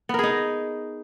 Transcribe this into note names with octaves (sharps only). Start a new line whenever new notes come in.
B3 D#4 G#4 A#4